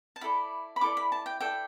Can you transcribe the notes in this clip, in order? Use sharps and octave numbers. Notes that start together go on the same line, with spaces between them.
A5
E4 A4 D5 B5
B5
E4 A4 D5 D6
B5
A5
G5
E4 A4 D5 G5